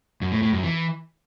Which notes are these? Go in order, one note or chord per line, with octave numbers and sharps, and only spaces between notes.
F#2
A2
A2
F#2
E3